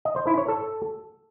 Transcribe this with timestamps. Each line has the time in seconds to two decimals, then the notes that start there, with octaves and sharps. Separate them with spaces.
0.05 D#5
0.16 C5
0.27 E4
0.38 C#5
0.48 A4